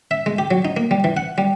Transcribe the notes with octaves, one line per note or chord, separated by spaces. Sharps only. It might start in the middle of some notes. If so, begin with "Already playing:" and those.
E5
G#3
G4
F#3
D#4
A#3
G3
E3
F#5
G3